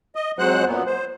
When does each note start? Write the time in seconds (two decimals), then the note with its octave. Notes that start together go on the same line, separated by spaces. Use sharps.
0.16 D#5
0.39 F2 F#3 G#3 C5 F#5 F#6
0.66 F#2 A#2 F#3 B3
0.86 C5